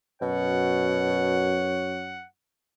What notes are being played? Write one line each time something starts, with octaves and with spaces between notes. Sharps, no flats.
F#2 B2 C#5 F#5